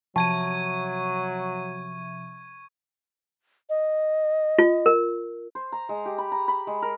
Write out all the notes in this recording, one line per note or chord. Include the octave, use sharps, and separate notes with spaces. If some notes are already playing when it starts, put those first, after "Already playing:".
C3 F3 F#3 E5 A5 C#6 G#6 D#7
D#5
F4
A#4
C5
A#5
G#3
G4
B5
A#5
B5
G#3
A#4